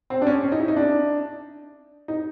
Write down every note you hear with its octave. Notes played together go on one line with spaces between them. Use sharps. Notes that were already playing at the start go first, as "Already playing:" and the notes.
C4
D4
C#4
C#4
D#4
E4
D#4
D4
D#4